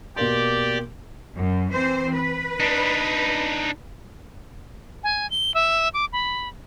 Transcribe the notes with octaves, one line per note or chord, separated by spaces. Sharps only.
B2 A#3 G4 D5 C6
F#2
E3 C4 C5
B4
D4 D#4
G#5
G7
E5
D6
B5